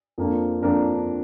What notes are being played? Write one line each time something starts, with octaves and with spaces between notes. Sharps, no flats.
F2 F3 A#3 D4
F2 F3 A#3 D4 A#4